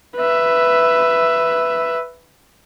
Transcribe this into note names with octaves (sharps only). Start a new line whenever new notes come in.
B4 E5